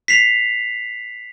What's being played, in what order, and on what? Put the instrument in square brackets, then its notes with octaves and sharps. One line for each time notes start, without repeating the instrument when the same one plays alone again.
[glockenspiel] B6 C7 F7